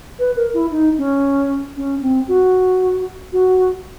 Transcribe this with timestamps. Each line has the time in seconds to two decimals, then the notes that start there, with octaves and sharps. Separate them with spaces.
0.19 B4
0.36 A#4
0.54 E4
0.71 D#4
0.98 C#4
1.77 C#4
2.02 C4
2.28 F#4
3.33 F#4